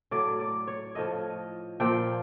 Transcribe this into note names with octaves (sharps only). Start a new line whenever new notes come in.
A2 F#3 D5
D5
C#5
A2 F3 D#5
A#2 F3 G5